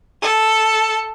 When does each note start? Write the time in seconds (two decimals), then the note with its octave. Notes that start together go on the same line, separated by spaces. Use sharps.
0.23 A4